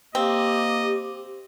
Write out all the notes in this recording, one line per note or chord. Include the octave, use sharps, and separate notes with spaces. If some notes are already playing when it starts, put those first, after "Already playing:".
A#3 C4 G4 D#5